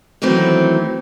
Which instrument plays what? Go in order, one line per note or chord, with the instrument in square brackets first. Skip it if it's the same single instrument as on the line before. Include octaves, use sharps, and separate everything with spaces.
[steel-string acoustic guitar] D#3 E3 F#3 A3 C4